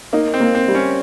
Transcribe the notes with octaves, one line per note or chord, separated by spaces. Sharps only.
A#3 D#4
C4
A#3
C4
G3
C#4